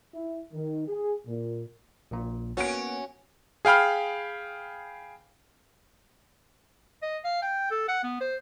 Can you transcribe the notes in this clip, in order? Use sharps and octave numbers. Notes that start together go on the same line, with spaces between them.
E4
D#3
G#4
A#2
A#1 A#2
A#3 B3 C#4 F#4 D7
G#4 F5 G5 B5 F6
D#5
F5
G5
A4
F#5
B3
C5